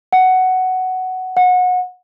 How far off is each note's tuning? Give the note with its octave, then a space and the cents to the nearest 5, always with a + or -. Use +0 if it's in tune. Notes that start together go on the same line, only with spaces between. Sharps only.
F#5 +10
F#5 -25